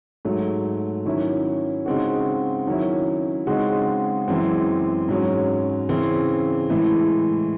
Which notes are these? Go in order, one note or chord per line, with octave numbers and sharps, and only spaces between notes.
G#2 F#3 A3
D#3 F#3 C#4 E4
C#3 G#3 C4 D#4 F#4
D#3 F#3 C#4 E4
C#3 G#3 C4 D#4 F#4
F#2 E3 G#3 C4
G#2 F#3 C#4
C#3 E3 C4
A2 E3 G#3